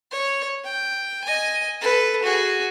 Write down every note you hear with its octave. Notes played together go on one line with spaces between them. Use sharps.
C#5
G5
D#5 G#5
A4 B4
F#4 G#4